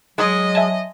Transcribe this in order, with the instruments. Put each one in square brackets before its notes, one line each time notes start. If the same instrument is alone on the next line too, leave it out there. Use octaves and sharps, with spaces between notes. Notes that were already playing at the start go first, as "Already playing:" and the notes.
[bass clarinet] F#3 [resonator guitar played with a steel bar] G#3 [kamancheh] D#5
[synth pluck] E5 G#5 A5